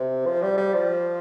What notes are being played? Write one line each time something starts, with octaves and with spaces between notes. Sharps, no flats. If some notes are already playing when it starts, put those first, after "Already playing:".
Already playing: C3
F3
G3
G3
F3